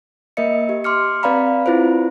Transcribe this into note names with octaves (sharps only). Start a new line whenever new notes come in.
A#3 A#4 D#5 E5 C#7
G4
C6 D6 F6 C#7
C4 B4 D5 F5 A#5 B5
C4 E4 F4 B4 C5